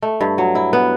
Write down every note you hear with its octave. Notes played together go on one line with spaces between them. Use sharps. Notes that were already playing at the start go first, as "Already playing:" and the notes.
A3
G2
F#3
E4
B3